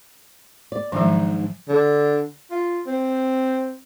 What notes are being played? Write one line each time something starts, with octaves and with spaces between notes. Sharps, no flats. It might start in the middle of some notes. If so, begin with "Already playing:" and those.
D5
G#2 D#3 F3 F#3 D4 D#4
D3
F4
C4